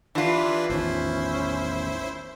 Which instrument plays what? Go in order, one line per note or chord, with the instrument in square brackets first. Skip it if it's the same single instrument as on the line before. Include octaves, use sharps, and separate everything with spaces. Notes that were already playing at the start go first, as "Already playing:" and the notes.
[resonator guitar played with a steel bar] E3 F4 [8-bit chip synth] D4 G4 B4 [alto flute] E5
[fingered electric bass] A1 E2 D#3 [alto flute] C#4 [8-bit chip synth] E4 C5